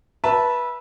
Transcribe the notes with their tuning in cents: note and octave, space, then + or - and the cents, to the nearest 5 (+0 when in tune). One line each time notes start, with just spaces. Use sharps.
B4 -20 E5 +0 A5 -5